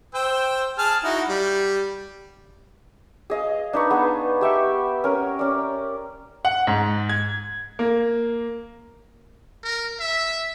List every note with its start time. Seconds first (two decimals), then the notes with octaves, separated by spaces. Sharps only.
0.15 C5 G5 E6
0.78 G#4 A5 F6
1.04 D#4 E4 F#4
1.29 G3
3.30 G#4 D#5 F5
3.73 D4 D#4 B4 C#6
3.91 B3 G#4
4.41 G4 E5 G5 C#6
5.04 C#4 A#4
5.39 C#4 D5
6.45 F#5
6.67 G#2
7.09 G#6
7.79 A#3
9.63 A#4
10.00 E5